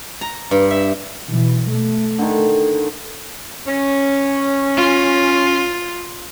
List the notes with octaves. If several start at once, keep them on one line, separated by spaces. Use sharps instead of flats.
A#5
G2
E5
B2 E3
A3
D3 D#3
C#4
F4